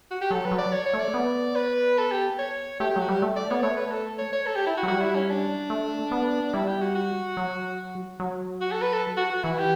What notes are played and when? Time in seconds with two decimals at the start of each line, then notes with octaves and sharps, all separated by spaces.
0.11 F#4
0.21 G4
0.31 F#3 A4
0.45 B4
0.51 F#3
0.58 D5
0.72 C#5
0.86 C#5
0.94 A3
1.00 D5
1.14 B3
1.55 B4
1.98 A4
2.11 G4
2.39 C#5
2.80 A3 G4
2.91 G4
2.96 F#3
3.01 F#4
3.09 G3 G4
3.22 A3
3.36 D5
3.50 B3 C#5
3.63 A3 C#5
3.77 B4
3.91 A4
4.18 C#5
4.32 C#5
4.46 A4
4.56 G4
4.67 E4
4.77 F#4
4.83 F#3
4.88 G3 F#4
5.01 E4
5.15 C#4
5.30 D4
5.70 A3
6.11 B3
6.54 G3 E4
6.67 G4
6.81 F#4
6.95 F#4
7.37 F#3
8.20 F#3
8.61 F#4
8.71 A4
8.81 B4
8.93 A4
9.17 F#4
9.30 F#4
9.43 E3 E4
9.58 G4